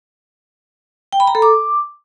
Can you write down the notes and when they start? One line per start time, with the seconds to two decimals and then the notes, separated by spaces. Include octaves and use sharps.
1.13 G5
1.20 B5
1.27 A#5
1.35 A4
1.42 D6